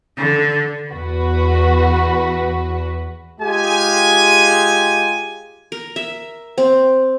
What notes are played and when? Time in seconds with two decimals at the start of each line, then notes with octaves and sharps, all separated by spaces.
0.18 D3
0.91 E2 F#4 B4
3.41 G#3 F4 G4 G#4 G#5
5.72 A#4
5.96 E5
6.58 C4